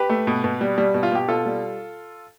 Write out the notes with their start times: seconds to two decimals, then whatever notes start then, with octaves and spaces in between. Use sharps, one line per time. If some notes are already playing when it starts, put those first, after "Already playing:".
Already playing: G4 B4
0.10 A3
0.27 B2
0.44 B2
0.61 G3
0.78 G3
0.94 B2
1.03 F4
1.12 B2 G4
1.28 B2 F4 A4
1.46 G3